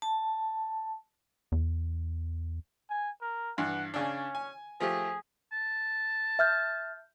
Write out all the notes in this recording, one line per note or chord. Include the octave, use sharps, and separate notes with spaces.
A5
E2
G#5
A#4
G2 E3 F#5
C#3 C#4 D4
G#5
F3 A3 G4 G#4
A5
E5 F6 G6